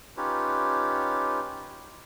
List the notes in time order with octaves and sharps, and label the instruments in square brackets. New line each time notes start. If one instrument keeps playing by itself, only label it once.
[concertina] C#4 D#4 F4 G4 B4 C#5